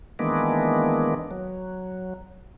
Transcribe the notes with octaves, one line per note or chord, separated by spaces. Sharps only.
D#3 E3 G#3 A#3 B3 D4
F#3